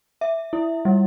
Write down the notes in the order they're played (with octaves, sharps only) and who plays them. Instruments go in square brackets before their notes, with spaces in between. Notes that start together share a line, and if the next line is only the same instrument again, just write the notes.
[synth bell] E5
E4
G3